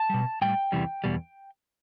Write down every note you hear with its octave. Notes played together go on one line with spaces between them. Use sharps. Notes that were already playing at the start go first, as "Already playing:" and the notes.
Already playing: A5
B2 G3
A2 G3 G5
E2 C3 E3 G3
E2 B2 G3